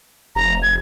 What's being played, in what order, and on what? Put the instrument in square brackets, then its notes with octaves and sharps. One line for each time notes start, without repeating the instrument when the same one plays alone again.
[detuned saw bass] F1 [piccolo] A#5
[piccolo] G#6